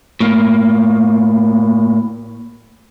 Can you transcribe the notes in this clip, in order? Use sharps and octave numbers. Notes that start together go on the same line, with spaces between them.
A2 A#3